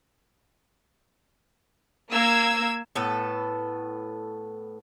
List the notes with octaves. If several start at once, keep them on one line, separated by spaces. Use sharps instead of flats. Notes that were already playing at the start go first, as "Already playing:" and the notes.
A#3 E6 G#6
A2 B3 A4